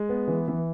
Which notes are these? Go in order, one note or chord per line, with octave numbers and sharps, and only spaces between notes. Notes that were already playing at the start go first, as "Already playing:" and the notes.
Already playing: G#3
B3
E3
E3